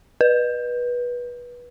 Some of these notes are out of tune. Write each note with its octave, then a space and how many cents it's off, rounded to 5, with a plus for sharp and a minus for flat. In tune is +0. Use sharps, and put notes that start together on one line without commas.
B4 -20